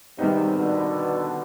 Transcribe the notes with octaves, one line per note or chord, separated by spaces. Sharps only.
G#2 C3 D#3 G3 B3 D#4
B2 D3